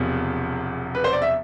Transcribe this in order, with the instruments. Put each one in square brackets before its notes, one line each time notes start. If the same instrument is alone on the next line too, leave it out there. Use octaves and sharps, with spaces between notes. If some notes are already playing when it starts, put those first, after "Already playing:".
Already playing: [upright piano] E1 E2 C3 F3
B4
C5
D5
E5